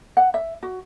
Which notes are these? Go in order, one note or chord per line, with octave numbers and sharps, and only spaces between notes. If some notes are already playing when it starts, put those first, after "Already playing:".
F#5
E5
F#4